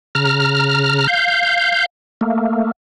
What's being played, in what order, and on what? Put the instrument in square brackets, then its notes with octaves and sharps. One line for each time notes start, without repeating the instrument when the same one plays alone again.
[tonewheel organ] C#3 A#5 F6
F5 G6
A3 A#3